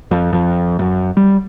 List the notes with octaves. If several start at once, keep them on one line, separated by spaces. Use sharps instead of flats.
F2
F2
F#2
G3